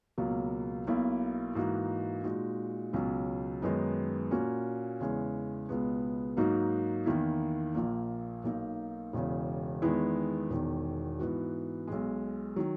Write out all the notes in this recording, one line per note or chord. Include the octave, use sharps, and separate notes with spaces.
C#2 B2 F#3 A#3
B1 B2 A#3 E4
G#2 E3 A#3 D#4 F#4
A#2 G#3 D#4 F#4
C#2 B2 F#3 C#4
F#2 D#3 G#3 B3 D#4
A#2 A#3 C#4 F#4
E2 C#3 E3 G#3 C#4
C#2 B2 G#3 B3
G#2 F#3 A#3 D#4 F#4
E2 D#3 A#3 E4
A#1 A#2 A#3
B1 B2 A#3 D#4
E1 E2 C#3
E2 D#3 G#3 B3 E4
E1 E2 D#3
G#2 E3 B3 F#4
B1 B2 G#3
D#3 F#3